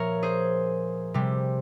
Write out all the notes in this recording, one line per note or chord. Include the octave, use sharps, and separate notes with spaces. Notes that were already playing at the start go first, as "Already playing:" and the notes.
Already playing: A#2 F3 A#4 C#5 E5
G#4 C5
C3 G3